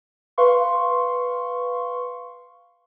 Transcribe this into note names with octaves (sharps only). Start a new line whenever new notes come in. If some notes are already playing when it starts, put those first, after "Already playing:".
B4 F5 C6 C#6